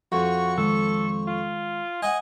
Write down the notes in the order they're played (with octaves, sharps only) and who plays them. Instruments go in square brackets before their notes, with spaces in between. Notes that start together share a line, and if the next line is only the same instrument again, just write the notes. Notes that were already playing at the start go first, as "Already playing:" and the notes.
[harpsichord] F2 [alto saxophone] F#4 [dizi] C#6
[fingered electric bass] D#3 G#3 [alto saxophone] A4
[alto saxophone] F4
[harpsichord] D#5 F#5 [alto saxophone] G#5